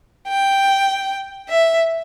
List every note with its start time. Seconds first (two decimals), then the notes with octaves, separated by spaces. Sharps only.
0.29 G5
1.49 E5